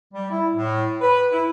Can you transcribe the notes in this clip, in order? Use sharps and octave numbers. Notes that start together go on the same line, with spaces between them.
G3
E4
A2
B4
E4